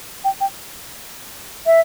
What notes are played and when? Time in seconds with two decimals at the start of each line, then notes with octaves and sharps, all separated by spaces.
0.24 G5
0.41 G5
1.66 E5